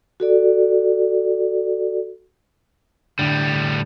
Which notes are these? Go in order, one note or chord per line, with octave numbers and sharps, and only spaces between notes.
F#4 A4 D5
A2 D3 G3